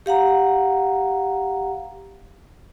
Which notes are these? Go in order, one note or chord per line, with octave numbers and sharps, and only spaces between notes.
G4 F5 F#5 A#5